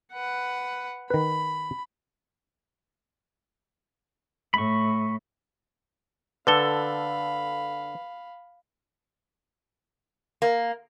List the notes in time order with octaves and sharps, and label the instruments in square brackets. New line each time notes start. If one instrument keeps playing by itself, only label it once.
[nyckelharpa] B4 F#5
[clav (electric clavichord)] D#3 B4 [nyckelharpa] B5
[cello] A2 [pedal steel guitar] B5 C#6
[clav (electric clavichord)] D3 A4 [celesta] B4 G7 [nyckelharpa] F5 B5
[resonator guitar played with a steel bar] A#3